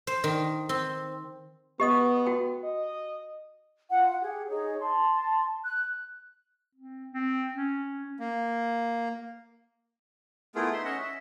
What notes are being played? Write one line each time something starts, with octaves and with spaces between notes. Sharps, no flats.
C5
D#3
C4
B3 G4 D#5 D#6
F#4 G5
D#5
F4 F#5
G4 G#4
D#4 G#4 C#5
A5 C6
F#6
C4
C4
C#4
A#3
A3 B3 E4 F4 G#4 A#4
D#4 E5 C6
C#4 C#5 D#5 E5 F#5
E5